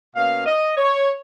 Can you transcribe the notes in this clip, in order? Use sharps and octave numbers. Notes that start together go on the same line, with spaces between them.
B2 A#3 C#4 F5
D#5
C#5